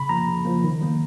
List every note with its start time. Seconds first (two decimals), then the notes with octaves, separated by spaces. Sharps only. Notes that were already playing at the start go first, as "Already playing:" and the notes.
Already playing: C#3 B5
0.09 F3 A#3 A#5
0.28 C#3
0.45 F3 A#3
0.64 D#3
0.81 F#3 A#3